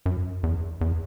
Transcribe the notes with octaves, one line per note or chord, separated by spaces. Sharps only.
F#2
E2
E2